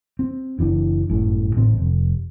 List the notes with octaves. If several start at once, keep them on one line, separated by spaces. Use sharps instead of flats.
C4
F#1 E3 D4
G1 F#2 A2
A1 A2 D3 C4
F1